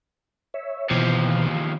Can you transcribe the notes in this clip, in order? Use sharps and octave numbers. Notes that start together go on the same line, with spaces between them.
C#5 E5
D#2 B2 E3 F3